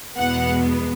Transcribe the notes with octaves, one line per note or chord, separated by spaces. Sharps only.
E2 B2 G#3 B3 F#5